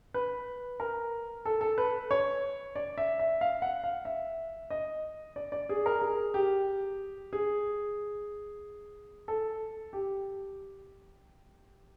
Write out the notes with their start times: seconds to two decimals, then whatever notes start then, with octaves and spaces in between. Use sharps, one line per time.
0.14 B4
0.80 A#4
1.45 A4
1.61 A4
1.78 B4
2.11 C#5
2.76 D5
2.98 E5
3.19 E5
3.41 F5
3.62 F#5
3.84 F5
4.05 E5
4.70 D#5
5.36 D5
5.52 D5
5.69 G#4
5.86 A#4
6.02 G#4
6.34 G4
7.33 G#4
9.28 A4
9.93 G4